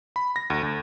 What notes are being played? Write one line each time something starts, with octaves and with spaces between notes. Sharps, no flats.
B5
A#6
D2
D2